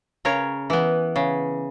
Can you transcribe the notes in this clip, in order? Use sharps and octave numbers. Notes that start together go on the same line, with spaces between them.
C#3 A#4 C#5
E3 B3
C#3